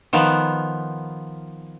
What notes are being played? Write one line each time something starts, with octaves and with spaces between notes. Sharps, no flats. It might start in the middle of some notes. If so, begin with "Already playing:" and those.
D#3 F3 B3